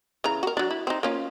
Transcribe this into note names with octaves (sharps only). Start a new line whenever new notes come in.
C#3 E3 A#5
F#4 A#4
F#3 D4
E4
C4 D#4
A#3 C#4 F4